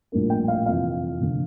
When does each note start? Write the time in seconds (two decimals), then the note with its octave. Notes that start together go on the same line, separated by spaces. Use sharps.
0.12 A#1 A2 G3 A#3
0.30 G5
0.48 F5
0.66 F2 C3 E3 F5
1.21 F1 D3